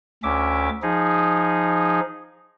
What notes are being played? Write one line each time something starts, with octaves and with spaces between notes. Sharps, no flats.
D2 C#4 E5 D6
F3 D#4 G#4